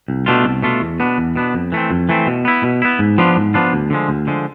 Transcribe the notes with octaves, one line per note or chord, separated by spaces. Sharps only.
C2
B2 A3 D4 F4
C2
B2 A3 D4 F4
E2
B2 B3 D4
E2
B2 B3 D4
F2
E3 A3 C4
F2
E3 A3 C4
B2
B3 E4
B2
B3 E4
G#2
F3 B3 D4 F4
G#2
F3 B3 D4 F4
D2
D3 F3 G#3
D2
D3 F3 G#3